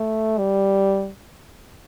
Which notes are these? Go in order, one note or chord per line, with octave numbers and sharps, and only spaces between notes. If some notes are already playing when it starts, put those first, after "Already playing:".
Already playing: A3
G3